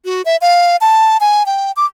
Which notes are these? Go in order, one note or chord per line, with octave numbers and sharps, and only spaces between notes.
F#4
E5
F5
A5
G#5
G5
D6